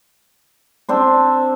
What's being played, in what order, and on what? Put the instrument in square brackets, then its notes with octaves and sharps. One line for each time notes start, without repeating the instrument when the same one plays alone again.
[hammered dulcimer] C4 D4 C5